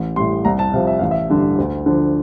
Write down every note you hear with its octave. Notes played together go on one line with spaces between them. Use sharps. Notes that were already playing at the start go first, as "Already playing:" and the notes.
Already playing: A1
A2 G3 C6
C2 A#5
A5
C3 F3 F5
E5
A1 F5
E5
G2 D3 G3
D2
D3 F3